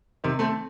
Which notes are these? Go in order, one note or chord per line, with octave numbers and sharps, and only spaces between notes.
C3 D#3
A3 C4